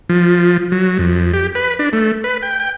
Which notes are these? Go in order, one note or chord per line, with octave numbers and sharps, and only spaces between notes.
F3
F#3
F2
G4
B4
D4
A3
B4
G5
G5